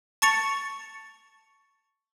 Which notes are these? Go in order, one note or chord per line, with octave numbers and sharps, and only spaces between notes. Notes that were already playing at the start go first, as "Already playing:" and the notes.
A5 C#6 A6 C#7 F7